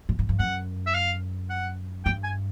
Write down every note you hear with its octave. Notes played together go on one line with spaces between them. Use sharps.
A2
G#2
G2
F#2 F#5
E5
F5
F#5
G2 G5
G#5